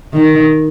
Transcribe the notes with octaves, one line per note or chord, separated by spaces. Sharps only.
D#3